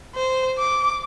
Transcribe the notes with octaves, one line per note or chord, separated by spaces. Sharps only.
C5
D6